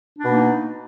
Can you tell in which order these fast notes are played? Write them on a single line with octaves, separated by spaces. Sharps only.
D4 B2 A#3 D#4